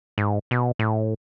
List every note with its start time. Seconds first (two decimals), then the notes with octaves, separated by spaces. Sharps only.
0.18 G#2
0.51 B2
0.79 A2